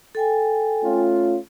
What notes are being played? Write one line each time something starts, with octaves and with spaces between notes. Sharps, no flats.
A4 G5 G#5
A3 C#4 F4